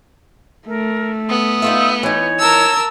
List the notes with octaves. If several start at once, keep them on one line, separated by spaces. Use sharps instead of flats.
A3 A#4
B3 D#6
D#4 F4 E5
E3 D#4 C#5
A#4 A5 E6